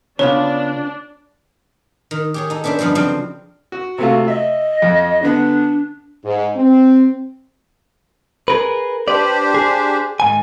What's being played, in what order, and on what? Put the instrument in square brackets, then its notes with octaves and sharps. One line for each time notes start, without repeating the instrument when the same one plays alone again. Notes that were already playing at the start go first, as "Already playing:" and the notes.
[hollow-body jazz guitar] C#3 B3 F4 [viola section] D4 [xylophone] C#5
[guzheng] D#3
G4 G#4 C#5
D#4 A4
B3 C#4 D4 C5 E5
G2 D3 F3 B3 D#4
C#3 F3 F#3 C4 D4
[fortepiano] F#4
[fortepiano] C3 A3 F4 [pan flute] F#4
[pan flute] D#5 [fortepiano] E5
[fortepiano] F2
[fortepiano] D3 B3 [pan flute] D4
[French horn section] G#2
C4
[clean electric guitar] G#4 A#4 B4
[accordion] D4 G4 C5 [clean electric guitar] B4 D5
[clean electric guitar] G#4
[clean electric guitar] G#2 G#5 [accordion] D#3